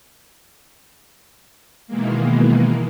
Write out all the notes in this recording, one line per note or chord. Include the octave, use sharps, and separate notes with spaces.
B2 D#3 E3 G#3 A#3